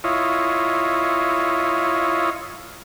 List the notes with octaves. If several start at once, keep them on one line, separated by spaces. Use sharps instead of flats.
E4 F4 C#5 D#5